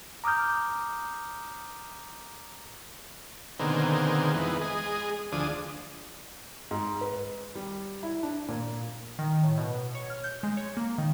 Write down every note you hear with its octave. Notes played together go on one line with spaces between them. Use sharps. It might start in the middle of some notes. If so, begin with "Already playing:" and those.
A#5 D6 D#6 F6 G6
B2 D3 D#3 A#3 C4 G#4
F2 E3 G#3 B3 D#4
G#3 G#4 D#5
D2 F3 D4 G#4 D#6
G#2
B4
G3
E4
D4
A#2
D#3
A2
B2
C#5
F6
G6
G#3
C#5
A#3
D#3